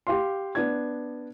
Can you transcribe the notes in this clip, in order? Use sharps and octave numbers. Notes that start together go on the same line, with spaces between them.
G4 F5 C6
B3 D4 G#6